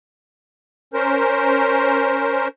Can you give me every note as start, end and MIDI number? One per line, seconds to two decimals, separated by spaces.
0.94 2.48 61
0.94 2.48 70
0.94 2.48 72